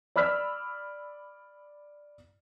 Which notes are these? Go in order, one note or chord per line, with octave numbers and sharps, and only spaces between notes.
D5 B5 E6 F6 B6